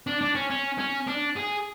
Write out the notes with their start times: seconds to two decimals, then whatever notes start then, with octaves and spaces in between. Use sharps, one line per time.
0.07 D4
0.21 D4
0.35 C#4
0.50 C#4
0.78 C#4
1.08 D4
1.37 G#4